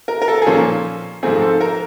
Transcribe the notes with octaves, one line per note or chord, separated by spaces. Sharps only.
A#4
A#4
A4
G#4
A#2 F3 A#3 C#4 A4
G#2 F3 A3 C4 G#4
A4
A#4